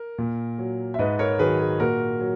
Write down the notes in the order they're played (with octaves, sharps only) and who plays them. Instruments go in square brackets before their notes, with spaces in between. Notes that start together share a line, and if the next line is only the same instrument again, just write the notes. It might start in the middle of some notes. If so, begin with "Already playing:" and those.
Already playing: [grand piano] A#4
A#2
F#3
E5
G#2 B4 D#5
A#4 C#5
D#3 F#3 G#4 B4
G#4
A#2 F#4 A#4
F#3